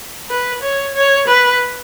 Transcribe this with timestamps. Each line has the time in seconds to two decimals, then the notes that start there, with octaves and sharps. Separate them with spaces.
0.30 B4
0.62 C#5
0.95 C#5
1.28 B4